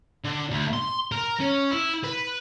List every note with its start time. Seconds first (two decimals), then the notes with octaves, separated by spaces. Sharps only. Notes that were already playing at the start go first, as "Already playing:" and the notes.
0.24 D3
0.50 D2
0.73 C6
1.12 A#4
1.40 C#4
1.71 E4
2.04 B4